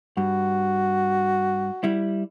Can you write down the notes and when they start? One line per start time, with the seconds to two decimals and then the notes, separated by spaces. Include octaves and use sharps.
0.17 G2 F#4
1.84 G3 E4